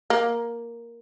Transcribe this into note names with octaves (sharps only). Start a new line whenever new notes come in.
A#3